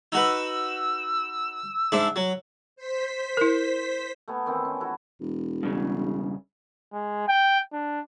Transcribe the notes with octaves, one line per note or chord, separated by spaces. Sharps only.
D#4 F#4 B4 E6
G#2 D4 E5
F#3
C5 B6
E4 A#4
A3 B3 G#5
D#3 E3 C4
C#4
E4 F#4 A4
E1
G2 C#3
G#3
G5
D4